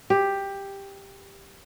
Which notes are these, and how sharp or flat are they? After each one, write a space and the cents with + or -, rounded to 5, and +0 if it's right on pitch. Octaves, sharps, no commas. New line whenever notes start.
G4 +10